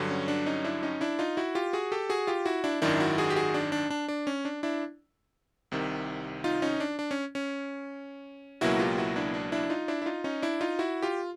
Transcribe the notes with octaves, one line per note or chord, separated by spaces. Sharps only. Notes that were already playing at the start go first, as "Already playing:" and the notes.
Already playing: G2 D3 F#3
C#4
D4
C#4 D#4
D4 E4
C#4 D#4
D4 E4
D#4 F4
E4 F#4
F4 G4
F#4 G#4
G4 A4
F#4 G#4
F4 G4
E4 F#4
D4 E4
G#1 F#2 D#3 D4 E4
E4 F#4
F#4 G#4
G4
F#4 G#4
D4
D4
D4
D4
C#4
D4
D4 E4
C2 C3 D#3
D#4 F4
C#4 D#4
D4
D4
C#4
C#4
C#2 B2 F#3 A#3 E4 F#4
F4 G4
E4 F#4
D4 E4
D4
D4 E4
D#4 F4
D4 E4
E4
D#4 F4
C#4 D#4
D4 E4
D#4 F4
E4 F#4
F4 G4